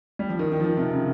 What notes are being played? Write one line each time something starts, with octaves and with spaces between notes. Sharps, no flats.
G3
F3
D#3
D#3
F3
D#3
C3
C#3